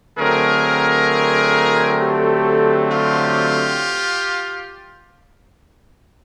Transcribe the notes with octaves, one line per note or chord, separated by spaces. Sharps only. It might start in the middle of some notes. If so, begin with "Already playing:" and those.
D3 F#3 A3 C4 G#4 A#4
G4 A4
F4 G4